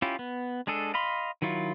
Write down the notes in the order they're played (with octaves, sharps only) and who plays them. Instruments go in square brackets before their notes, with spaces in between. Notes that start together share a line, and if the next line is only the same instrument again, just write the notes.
[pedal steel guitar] C#4 E4 F4 G4
B3
G#3 D4 G#4 A4
D#5 F5 B5 C6
D#3 F#3 E4 F4